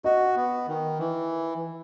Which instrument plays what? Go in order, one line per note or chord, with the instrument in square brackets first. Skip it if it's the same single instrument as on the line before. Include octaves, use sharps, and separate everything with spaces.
[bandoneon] F#4 [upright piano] D#5
[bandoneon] B3
D#3
E3